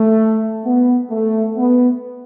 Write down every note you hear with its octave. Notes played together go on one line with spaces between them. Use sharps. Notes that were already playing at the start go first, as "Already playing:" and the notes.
Already playing: A3
B3
A3
B3